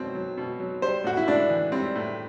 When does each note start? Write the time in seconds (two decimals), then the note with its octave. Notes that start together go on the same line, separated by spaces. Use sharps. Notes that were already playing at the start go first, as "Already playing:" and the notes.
Already playing: B2 F#3 C4
0.15 F#3
0.37 B2
0.60 F#3
0.82 G3 C5
1.04 A2 F#4
1.17 E4
1.27 A2 D4
1.50 E3
1.72 G3 C4
1.96 A2